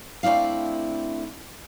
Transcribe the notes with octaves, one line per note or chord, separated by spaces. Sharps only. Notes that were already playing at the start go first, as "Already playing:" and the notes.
A3 C4 D4 E4 F5